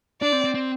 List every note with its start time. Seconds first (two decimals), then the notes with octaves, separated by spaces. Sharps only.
0.22 D4 D5
0.32 C4
0.44 C4
0.54 C4